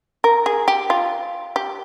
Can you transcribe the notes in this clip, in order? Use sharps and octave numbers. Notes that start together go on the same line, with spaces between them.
A#4
G#4
G4
F4
G4